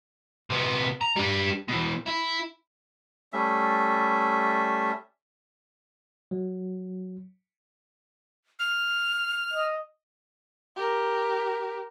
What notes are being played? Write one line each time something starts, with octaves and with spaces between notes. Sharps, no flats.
C3 B3
A#5
G3 D4
B2 E3
E4
G3 A3 C#4 E5
F#3
F6
D#5
G4 A#4